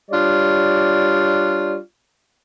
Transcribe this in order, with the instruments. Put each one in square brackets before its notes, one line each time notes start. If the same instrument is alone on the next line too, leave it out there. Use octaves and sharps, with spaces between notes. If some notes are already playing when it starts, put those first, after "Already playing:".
[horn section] G3 D4 F4 C#5 D5